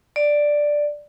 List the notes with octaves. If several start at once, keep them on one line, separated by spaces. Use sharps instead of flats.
D5